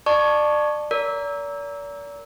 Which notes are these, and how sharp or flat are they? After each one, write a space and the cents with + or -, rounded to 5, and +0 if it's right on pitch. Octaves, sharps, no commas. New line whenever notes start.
D5 +30 A5 +0 C#6 +0
A#4 +0 D5 -40